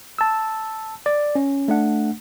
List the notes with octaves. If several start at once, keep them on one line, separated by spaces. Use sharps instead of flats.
A5 E6
D5
C#4
A3 D4 F#5